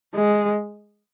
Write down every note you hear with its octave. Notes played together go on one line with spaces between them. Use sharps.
G#3